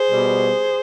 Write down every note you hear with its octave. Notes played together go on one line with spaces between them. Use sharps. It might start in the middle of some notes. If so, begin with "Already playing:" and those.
Already playing: G#4 C5
B2 G3 B3